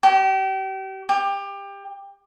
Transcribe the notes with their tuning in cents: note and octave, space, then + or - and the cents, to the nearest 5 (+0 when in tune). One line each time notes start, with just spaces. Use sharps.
G4 -35
G4 +25